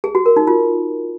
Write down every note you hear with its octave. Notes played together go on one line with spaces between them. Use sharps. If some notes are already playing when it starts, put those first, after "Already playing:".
G#4
F#4
A#4
D#4
F4